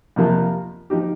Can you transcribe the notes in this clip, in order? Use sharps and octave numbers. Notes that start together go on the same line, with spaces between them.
F2 C3 F3 A#3 F4
F3 D#4 G4